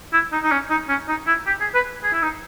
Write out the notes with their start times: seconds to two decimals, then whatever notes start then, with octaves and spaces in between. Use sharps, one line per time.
0.13 E4
0.33 D#4
0.43 D#4
0.52 C#4
0.70 D#4
0.89 C#4
1.08 D#4
1.27 E4
1.47 G4
1.61 G#4
1.75 B4
2.04 G#4
2.13 E4
2.22 D#4